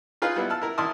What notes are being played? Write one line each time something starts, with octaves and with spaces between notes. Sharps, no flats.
D#4 F4 G#4 B4 F5
G3 B3 E4
A5 E6 F6
E4 A#4
G#1 E4 A5 C6 D#6 F6